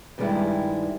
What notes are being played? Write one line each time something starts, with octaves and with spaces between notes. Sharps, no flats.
G2 D#3 G3 G#3 D4 E4